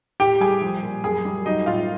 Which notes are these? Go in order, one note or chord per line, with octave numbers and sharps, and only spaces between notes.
A2 G4 G5
G3 G#4 G#5
F3
A#2
F#2 G#4 G#5
G3
F#3 D#4 D#5
A2 F4 F5